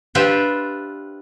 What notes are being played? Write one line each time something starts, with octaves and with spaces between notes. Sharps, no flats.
D4 F4 G4 B4 C5 E5